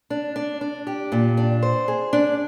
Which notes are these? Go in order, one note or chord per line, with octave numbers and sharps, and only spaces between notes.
D4
D4
D4
G4
A#2
D4
C5
G#4
D4